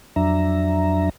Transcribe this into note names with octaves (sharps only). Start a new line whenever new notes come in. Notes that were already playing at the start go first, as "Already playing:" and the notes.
F2 F#3 D4 E5 A#5